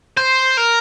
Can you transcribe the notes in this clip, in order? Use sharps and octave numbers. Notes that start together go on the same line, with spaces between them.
C5
A#4